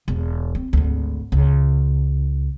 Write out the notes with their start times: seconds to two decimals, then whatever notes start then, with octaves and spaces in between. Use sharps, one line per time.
0.08 E1
0.55 C4
0.73 G#1 D2
1.32 C#2